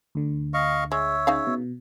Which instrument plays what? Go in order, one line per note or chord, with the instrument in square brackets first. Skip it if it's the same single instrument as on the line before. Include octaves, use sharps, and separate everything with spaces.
[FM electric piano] D2 D3
[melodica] D#5 F5 C#6
[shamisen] G#3 [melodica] C#5 E5
[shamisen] C#3 D#4 F5
[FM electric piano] B2